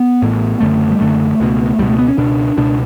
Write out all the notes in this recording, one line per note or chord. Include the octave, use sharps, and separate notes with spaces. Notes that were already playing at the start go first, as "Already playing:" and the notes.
Already playing: B3
A1 A2
F#1 F#2 D3 A3
G3
F#1 F#2 D3 A3
C#2 B2
C#2 B2 G3
A3
B3
C#4
C#2 B2 D4
C#2 B2 D4